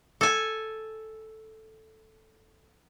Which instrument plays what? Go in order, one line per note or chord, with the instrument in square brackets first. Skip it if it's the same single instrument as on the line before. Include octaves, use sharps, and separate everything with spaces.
[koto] A4 G#5